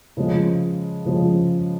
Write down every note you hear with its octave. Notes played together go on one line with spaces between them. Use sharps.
C#3 F3 G#3
C#3 F3 G#3